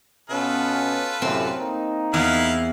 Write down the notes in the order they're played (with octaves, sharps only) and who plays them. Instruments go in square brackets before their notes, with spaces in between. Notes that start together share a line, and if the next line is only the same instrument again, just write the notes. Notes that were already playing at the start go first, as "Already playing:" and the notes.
[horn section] B2 B3 C#4 [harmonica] F4 A4 B4
[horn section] F#2 A2 C3 [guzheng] C4
[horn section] A#3 D#4
[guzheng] E2 [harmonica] E4 F5